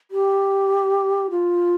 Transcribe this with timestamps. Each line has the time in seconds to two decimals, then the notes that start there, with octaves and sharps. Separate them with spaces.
0.11 G4
1.31 F4